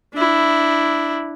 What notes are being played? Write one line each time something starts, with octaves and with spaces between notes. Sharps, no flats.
D4 E4